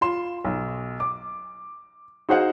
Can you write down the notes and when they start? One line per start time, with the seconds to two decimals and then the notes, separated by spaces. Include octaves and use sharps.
0.01 F4 C6 E7
0.45 B1
1.00 D6
2.29 D#4 F#4 G#4 C5 F5 F#5